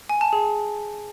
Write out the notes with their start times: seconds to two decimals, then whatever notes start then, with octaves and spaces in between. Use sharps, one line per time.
0.09 G#5
0.21 A5
0.33 G#4